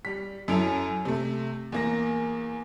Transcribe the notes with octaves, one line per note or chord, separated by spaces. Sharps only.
G3 B6
F#2 C#4 E4 A4 D7 F7
C3 A3
E2 A#3 A#6